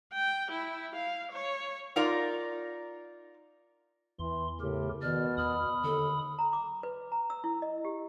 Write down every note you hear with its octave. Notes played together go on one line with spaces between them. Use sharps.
G5
E4
F5
C#5
D#4 F4 A#4 D5
E2 E3 C6
A2 C#3 G4 A#4
B2 D#3 D5 F6
E2 B5 D#6 F6
D#2 D3 A4
A#5
D6
B4
A#5
E6
E4
D#5
G4